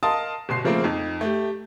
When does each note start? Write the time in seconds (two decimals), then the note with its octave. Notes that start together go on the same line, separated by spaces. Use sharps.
0.03 A#4 D#5 F5 A5 C6 D#6
0.49 G1 B2 C6 C7
0.64 C#3 F3 A3 A#3 C4
0.84 F2 D#4
1.21 A3 G4